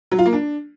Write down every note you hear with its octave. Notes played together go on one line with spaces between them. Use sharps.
F#3
F4
A#3
D4